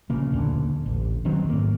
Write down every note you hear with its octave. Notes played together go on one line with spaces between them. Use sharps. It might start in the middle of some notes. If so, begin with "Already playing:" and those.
A#1 C#3 A#3
E1 D2 A#2 D3
A1
D1 D#3 F#3 C4
G#2 A#3